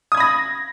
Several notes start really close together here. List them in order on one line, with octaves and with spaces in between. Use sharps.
D#6 G#6 B5 A#6